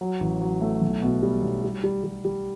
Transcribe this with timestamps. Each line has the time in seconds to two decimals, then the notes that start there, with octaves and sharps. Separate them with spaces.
0.01 F#3
0.20 A1
0.41 F#3
0.61 A3
0.82 B1
1.02 B2
1.22 G3
1.42 B1
1.64 G3
1.84 G3
2.04 G3
2.25 G3